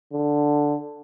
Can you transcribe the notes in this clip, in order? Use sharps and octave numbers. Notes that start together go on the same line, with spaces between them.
D3